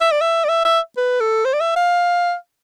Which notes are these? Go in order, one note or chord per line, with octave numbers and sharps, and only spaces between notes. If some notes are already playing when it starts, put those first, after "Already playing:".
E5
D5
E5
D5
E5
E5
B4
A4
C5
D5
E5
F5